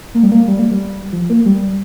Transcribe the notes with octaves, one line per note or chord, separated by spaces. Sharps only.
A#3
G3
A#3
G3
A#3
G3
F3
A#3
G3